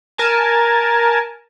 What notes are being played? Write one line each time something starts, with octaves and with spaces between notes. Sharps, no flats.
A#4 G#5 A5